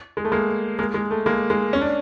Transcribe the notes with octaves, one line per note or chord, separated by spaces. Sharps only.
G#3
A3
G#3 A#3
G#3 A#3
G#3
A3
G#3 A#3
G#3
C#4
D4